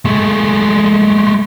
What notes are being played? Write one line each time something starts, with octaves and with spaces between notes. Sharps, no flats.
G#3 A3